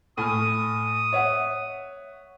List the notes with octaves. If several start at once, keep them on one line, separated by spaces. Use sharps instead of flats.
A2 G#5 D#6 F6
C#5 E5 F#5